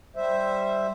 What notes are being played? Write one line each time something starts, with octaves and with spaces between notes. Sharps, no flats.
G3 C5 E5